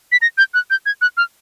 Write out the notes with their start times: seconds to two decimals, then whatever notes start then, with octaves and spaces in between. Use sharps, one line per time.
0.12 B6
0.22 A#6
0.38 G6
0.54 F#6
0.70 G6
0.86 G#6
1.01 F#6
1.17 F6